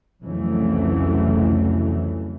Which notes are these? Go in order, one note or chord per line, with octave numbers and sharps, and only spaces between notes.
C2 F2 C#3 E3 F#3 A3